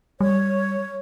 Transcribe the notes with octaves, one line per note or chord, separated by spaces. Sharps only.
G3 C#5